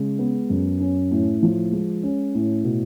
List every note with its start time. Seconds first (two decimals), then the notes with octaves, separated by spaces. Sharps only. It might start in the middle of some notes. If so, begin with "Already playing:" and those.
Already playing: C#3 G#3
0.19 B3
0.50 F#2
0.80 C#4
1.11 A2
1.43 F3
1.72 G#3
2.03 C#4
2.35 A2
2.64 B2